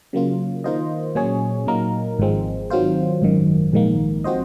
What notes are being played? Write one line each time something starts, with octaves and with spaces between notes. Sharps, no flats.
C#3 F#3 A#3 F4
D#3 A#3 F4 C5 D#5
A#2 F#3 C#4 G#4 C#5
A#2 F#3 A#3 D#4 A#4
G#1 G#2 F3 G#3 C4
D#3 F#3 C4 F4 C5
G#1 F#2 D#3
A#1 G#2 D#3 A#3
F3 C4 F#4 C5 D#5